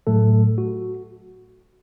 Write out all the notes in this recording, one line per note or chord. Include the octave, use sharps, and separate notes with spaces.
A2 F#3 A3 A4
F#4